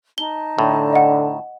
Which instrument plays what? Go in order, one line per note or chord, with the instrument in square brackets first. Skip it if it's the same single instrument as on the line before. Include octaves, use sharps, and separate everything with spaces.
[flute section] D#4 A5 [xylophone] G7
[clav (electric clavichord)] A2 [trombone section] D3
[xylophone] D#5 F#5